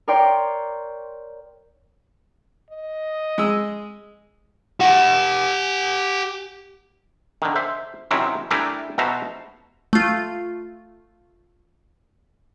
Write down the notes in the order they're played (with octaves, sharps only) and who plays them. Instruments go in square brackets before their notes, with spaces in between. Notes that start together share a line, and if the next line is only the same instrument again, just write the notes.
[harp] A#4 C#5 D5 G5 C6
[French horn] D#5
[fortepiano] G#3 E6
[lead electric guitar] G4 F#5
[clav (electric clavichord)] D3 D#3
C5 E5
C3 D#3 F#3 C4 C#4 E4
A3 D4 E4 G4 A#4 G#5
B2 F#4 C5 E5 A5 A#5
[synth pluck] A3 F4